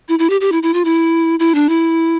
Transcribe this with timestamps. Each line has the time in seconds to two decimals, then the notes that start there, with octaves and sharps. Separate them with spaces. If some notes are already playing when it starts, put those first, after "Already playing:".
0.09 E4
0.19 E4
0.30 G4
0.41 G4
0.52 E4
0.63 E4
0.74 F4
0.85 E4
1.39 E4
1.55 D4
1.69 E4